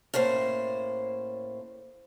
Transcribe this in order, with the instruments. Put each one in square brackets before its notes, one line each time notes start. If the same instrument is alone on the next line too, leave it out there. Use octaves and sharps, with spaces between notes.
[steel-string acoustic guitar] A2 A#3 C#4 C5